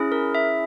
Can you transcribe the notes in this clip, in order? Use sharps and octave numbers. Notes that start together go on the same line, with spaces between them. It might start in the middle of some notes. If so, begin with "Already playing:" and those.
Already playing: C#4 E4 G#4
A#4
E5